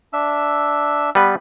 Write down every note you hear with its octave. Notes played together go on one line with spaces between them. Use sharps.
D4 E5 E6
G3 B3 B4